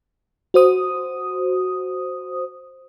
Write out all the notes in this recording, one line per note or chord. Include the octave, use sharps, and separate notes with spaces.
F#4 C5 D#6